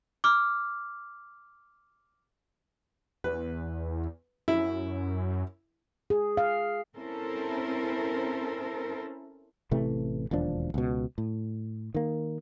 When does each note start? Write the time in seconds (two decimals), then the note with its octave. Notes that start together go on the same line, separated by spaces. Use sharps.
0.24 D6 F6
3.24 E2 B4
4.48 F#2 E4
6.10 G#4
6.37 F5
6.97 C4 C#4 E4 A4 A#4 C5
9.71 A1 C3 E3 A3
10.31 E1 D#2 F3 D4
10.74 C#2 B2
11.18 A2
11.95 D#3 A#3